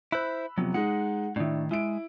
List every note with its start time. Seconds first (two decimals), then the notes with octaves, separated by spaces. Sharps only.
0.12 E4 C5 B5 E6 F#6
0.58 F2 C3 F#3 B3
0.74 G#3 D#4 F#5
1.36 A2 D#3 D4 E4
1.71 G#3 E4 D7